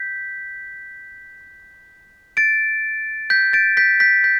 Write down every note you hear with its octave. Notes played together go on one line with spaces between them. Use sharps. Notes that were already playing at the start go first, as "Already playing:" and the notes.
Already playing: G6 B6
A6 D7
G6 B6
A6 D7
G6 B6
G6 B6
G6 B6